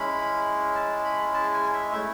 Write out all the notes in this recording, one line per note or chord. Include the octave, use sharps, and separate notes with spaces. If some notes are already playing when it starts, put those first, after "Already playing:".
Already playing: G#3 C#4 E4 B5
A5
B5
A5
G#5
E5
A3 E4 E5